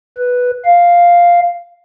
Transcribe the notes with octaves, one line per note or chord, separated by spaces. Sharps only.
B4
F5